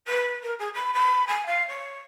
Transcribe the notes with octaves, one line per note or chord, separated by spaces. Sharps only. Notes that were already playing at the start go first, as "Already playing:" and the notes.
B4
A#4
G#4
B5
B5
G#5
F5
C#5